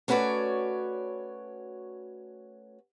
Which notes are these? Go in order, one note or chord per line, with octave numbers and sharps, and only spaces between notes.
A3 C#4 F#4 B4 C#5 D5